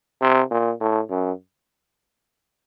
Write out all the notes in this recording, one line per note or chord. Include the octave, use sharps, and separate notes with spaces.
C3
A#2
A2
F#2